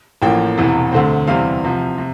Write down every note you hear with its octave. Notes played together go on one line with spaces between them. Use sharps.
A1 A2 F3 A#3 G5
E1 E2 C3 E3
D2 D3 A3 C4
E2 C3 E3 G3 C4 F5
C2 C3 F3
C3